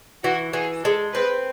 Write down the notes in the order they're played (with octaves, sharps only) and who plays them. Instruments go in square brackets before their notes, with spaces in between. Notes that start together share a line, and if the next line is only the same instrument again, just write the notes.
[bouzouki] E3 [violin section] F#4
[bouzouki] E3 [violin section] G#4
[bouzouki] G#3 [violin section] A4
[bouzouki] C4 [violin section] B4